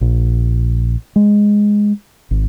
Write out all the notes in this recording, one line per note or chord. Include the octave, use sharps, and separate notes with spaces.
A#1
G#3
G#1